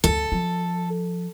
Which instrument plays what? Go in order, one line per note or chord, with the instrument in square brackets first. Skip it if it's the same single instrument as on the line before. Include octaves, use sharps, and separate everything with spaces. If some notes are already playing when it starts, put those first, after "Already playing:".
[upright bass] D2 G2 [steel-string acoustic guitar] A4
[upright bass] F3